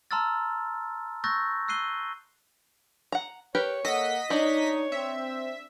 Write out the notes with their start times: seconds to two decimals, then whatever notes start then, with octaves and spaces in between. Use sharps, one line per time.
0.11 A5 A#5 C6 E6 F6 A6
1.24 C#6 E6 F#6 G6 A6 A#6
1.68 E6 F#6 C7 D#7 G7
3.12 F#5 A#5
3.55 G4 A#4 B4 C#5
3.85 A#3 A4 D#5 F#5 B6
4.30 D4 D#4 G4 C#5 D5
4.92 C4 E5